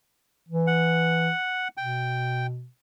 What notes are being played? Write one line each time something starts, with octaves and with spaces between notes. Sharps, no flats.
E3
F#5
B2 G5